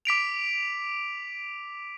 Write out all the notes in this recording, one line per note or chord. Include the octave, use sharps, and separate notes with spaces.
D6 B6 D7 F7